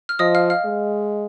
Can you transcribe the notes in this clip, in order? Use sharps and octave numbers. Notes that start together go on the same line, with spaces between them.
F6
F3 D#5 D#6
F5 F6
F5 F6
G#3